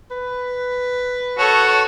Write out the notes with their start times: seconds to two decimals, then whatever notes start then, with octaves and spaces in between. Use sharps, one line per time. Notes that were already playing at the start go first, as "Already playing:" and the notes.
0.11 B4
1.38 F#4 A4 C#5